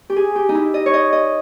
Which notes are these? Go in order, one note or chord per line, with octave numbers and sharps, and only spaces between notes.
G4
G#4
G4
D#4
E4
D#5
C#5
D#5
D#5